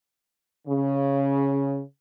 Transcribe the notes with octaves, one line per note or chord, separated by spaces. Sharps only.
C#3